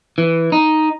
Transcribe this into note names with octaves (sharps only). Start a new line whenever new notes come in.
E3
D#4